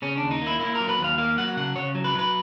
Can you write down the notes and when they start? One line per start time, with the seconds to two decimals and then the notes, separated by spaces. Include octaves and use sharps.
0.02 C#3 C#4
0.17 D#2 D4
0.31 D#4
0.42 A#3 E4
0.60 A#3 E4
0.75 A#4
0.80 F#3
0.89 B4
0.99 D#2
1.04 F5
1.18 A#3 F5
1.38 F#3 F#5
1.57 C#3 F#5
1.76 C#3 C#5
1.95 F#3
2.04 B4
2.14 F#3 B4